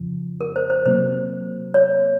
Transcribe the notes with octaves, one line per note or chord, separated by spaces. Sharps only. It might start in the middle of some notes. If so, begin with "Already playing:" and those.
Already playing: F2 C#3 F3
A#4
C5
C5
C3 F#3 A#3 C5
C#5